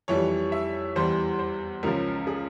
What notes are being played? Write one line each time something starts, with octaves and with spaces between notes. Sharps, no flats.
F2 E3 G3 C#5
E5
E2 E3 G3 C5
C5
C#2 C#3 F3 A#4
G#4